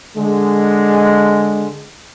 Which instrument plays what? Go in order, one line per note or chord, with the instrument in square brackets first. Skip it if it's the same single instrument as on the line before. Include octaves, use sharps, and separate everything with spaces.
[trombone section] D3 G#3